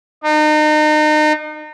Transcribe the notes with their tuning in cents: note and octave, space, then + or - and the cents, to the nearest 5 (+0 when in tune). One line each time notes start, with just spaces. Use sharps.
D#4 -35